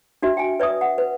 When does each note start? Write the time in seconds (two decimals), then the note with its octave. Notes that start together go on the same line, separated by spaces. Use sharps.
0.23 D4 F#4 E5
0.37 G5 G#5
0.60 B4 D5 E5 D#6
0.81 F#5
0.98 B4